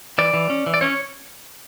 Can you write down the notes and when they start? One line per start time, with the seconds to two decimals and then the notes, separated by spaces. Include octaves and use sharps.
0.18 E3 D5
0.34 E3
0.50 C#4
0.66 E3
0.74 D5
0.81 C#4 C#5